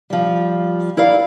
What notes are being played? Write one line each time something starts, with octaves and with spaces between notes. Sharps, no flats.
F3 G3
E4 A#4 D5 F5